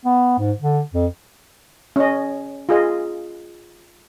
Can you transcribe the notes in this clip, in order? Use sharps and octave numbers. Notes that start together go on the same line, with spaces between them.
B3
G#2
D3
F2
C#4 D#5
F4 G#4 D#5